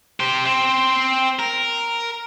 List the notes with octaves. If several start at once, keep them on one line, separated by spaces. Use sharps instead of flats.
G4 C5
C4
A#4